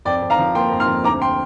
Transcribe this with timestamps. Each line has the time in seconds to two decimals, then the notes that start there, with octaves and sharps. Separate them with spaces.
0.05 F2 D5 G5
0.22 F2
0.30 F5 A#5
0.39 F3
0.55 A#3 G5 C6
0.72 F2
0.80 C6 F6
0.88 F2
1.04 D2 A#5 D6
1.21 G5 C6